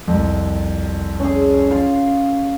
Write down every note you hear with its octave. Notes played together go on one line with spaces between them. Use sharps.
C2 F2
C#4 G#4
F4 F5